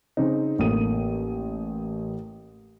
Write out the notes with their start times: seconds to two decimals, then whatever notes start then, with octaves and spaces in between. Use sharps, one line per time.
0.17 C#3 C4 C#4 D#4
0.59 A1 A#3 A4 D#6 D#7